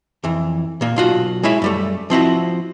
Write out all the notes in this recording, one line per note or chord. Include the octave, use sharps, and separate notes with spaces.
F2 E3
A#2 A#3
B1 F4 F#4
G#3 E4 C#5 E5
F#2 G3 A3
F3 C4 E4 F#4